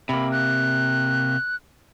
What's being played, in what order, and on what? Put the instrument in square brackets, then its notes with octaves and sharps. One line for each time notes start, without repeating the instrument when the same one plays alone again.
[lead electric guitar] C3 A#3 [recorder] B5
[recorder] F#6